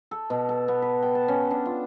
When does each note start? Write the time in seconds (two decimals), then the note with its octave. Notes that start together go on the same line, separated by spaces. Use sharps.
0.11 A4
0.30 B2
0.49 A4
0.68 B3
0.82 B4
1.02 G5
1.15 A5
1.28 C#4
1.51 D4
1.66 F4